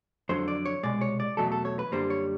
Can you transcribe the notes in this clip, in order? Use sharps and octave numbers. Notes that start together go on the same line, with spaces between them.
F2 D3 F#3 C5
D5
C#5
C2 B2 G#3 D5
C#5
D5
E2 B2 F#3 A3 A4
A4
C#5
B4
F#2 D3 G3 A#3 C5
C#5